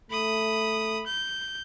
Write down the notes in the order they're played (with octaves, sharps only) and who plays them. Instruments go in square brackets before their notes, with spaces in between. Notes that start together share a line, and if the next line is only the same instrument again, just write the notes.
[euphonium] A3 [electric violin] B5 D#6
[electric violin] G6